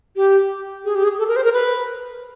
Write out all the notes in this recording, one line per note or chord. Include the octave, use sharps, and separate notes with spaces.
G4
G#4
G4
G#4
A4
A#4
C5
A#4
B4